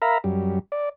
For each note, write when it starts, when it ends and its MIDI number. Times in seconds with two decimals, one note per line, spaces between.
0.02 0.18 70
0.02 0.18 76
0.02 0.18 77
0.02 0.18 82
0.02 0.18 83
0.24 0.59 42
0.24 0.59 55
0.72 0.89 74